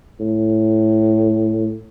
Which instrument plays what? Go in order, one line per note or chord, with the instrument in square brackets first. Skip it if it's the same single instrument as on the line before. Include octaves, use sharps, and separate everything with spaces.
[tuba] A2